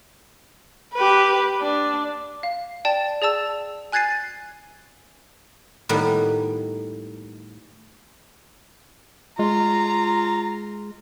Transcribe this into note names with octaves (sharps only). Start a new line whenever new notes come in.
G4 B4
D4
F5
D5 G5 A5
G#4 D5 A5 E6
G#5 F#6 G#6 A6 C7 D#7
A2 D#3 G3 A#3 B3
G#3 F4 A#5